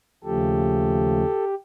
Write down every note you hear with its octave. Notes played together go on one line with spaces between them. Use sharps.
D#2 C#3 F3 A3 G4 A4